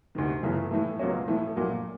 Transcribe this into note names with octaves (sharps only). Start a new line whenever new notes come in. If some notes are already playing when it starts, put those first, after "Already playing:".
D2 C3 D#3
G1 F#2 C#3 E3 A3
A2 E3 A3
C#2 B2 F#3 A#3 C#4
A2 E3 A3
A#1 A#2 F#3